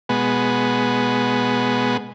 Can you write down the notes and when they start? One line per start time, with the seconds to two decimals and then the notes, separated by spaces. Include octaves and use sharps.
0.09 B2 G#3 B3